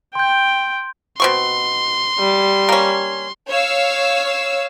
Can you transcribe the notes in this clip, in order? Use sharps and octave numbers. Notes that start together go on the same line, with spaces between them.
G5 C6 G6
B2 C4 C6 C#6
G3
A#3 C#4
C#5 F5 E6